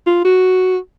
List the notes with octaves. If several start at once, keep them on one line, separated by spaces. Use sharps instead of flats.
F4
F#4